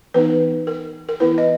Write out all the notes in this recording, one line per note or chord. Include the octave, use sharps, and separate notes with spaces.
E3 B3 D#4 B4
A#4
A#4
E3 B3 E4 B4
D#5